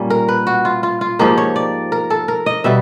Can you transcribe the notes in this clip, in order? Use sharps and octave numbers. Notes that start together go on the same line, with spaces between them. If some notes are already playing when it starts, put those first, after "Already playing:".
Already playing: A#2 G3 A#3 C#4
A#4
B4
F#4
F4
F4
F4
G#2 F3 A#3 D#4 G4
C#5
D5
A#4
A4
A#4
D#5
B2 G3 E5